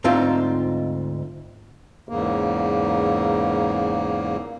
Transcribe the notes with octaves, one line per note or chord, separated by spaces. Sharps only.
D2 G#2 C4 D#4 F4 E5
E2 G#2 C#3 A#3